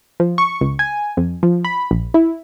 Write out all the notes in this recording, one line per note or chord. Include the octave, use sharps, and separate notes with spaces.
F3
C#6
C#2
G#5
F2
F3
B5
A#1
E4